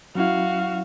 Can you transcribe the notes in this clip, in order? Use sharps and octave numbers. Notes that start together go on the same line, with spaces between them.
F#3 C#4 E4 F#4 F5